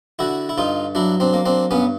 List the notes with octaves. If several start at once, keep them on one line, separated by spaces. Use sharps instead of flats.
D3 E4 F#4
E4
G2 D#4 F4
F#3 D4 E4
C4 D4
A#3
C4 D4
G2 B3 C#4